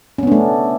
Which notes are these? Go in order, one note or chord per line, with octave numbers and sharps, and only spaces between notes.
A3 B3 C#4 D4